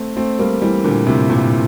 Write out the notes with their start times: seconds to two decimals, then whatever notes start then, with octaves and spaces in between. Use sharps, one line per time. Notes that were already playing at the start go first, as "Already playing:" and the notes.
Already playing: A3 C4
0.17 A3 C4
0.39 G3 A#3
0.62 E3 G3
0.84 A#2 D3
1.07 A2 C3
1.30 G2 A#2